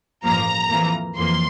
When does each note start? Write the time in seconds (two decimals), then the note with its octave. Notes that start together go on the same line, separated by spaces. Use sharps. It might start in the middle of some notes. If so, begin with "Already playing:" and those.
0.24 A1 G2 F3 A#3 A#5
0.70 F2 E3 A#3
1.16 F2 E3 A#3 C6